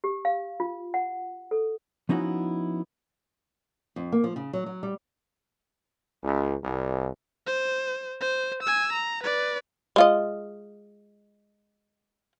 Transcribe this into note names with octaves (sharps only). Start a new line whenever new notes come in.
G4
F5
F4
F#5
A4
F3 B3 C#4 D#4 E4 F#4
F2
A#3
F3
C#3
F#3
F#3
G3
C#2
C2
C5
C5
G#5 E6
A#5
B4 D5
G#3 F4 D#5